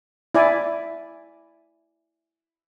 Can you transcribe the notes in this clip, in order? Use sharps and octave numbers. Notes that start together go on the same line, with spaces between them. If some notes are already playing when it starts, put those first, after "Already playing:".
E4 D5 G#5